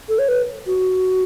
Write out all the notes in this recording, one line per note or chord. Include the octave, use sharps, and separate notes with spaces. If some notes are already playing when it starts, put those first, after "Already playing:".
A4
C#5
B4
F#4